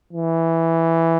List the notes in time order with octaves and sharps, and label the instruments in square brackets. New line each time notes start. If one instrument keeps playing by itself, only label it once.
[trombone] E3